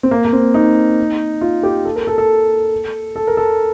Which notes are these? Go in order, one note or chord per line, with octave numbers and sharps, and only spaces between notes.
C4
A#3
A#3
C4
D#4
F4
G4
A4
A#4
A4
A4
A4
A#4
A4